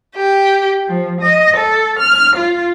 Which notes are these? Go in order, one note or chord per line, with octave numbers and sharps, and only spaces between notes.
G4
F3
D#5
A4
F6
F4